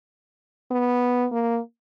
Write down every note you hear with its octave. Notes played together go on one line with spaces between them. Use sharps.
B3
A#3